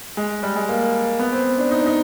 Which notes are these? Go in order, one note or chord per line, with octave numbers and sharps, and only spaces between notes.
G#3
G3
G#3
A#3
B3
C4
D4
D#4
D4
D#4